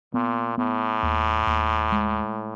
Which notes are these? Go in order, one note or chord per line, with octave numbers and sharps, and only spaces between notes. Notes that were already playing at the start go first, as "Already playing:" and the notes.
A#2 B3
A2 B3
D#2
D#2
G#3